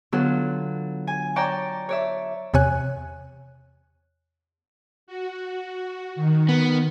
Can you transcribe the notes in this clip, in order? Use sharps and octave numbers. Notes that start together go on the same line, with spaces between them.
D3 F#3 B3 F4 A4
G#5
C#5 D5 G5 A5 A#5 C#6
C#5 D5 E5
E2 C3 C#5 G#5 F#6
F#4
D#3
B3